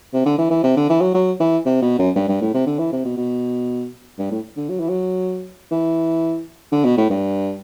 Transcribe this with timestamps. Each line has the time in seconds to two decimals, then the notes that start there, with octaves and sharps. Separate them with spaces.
0.13 C3
0.26 D3
0.38 E3
0.50 E3
0.63 C3
0.76 D3
0.89 E3
1.01 F#3
1.14 F#3
1.40 E3
1.65 C3
1.82 B2
1.99 F#2
2.15 G2
2.28 G2
2.41 A2
2.54 C3
2.66 D3
2.79 E3
2.92 C3
3.05 B2
3.17 B2
4.18 G2
4.31 A2
4.57 D3
4.69 F#3
4.79 E3
4.89 F#3
5.71 E3
6.72 D3
6.84 B2
6.97 A2
7.10 G2